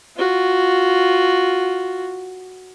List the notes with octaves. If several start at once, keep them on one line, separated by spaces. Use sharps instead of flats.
F4 F#4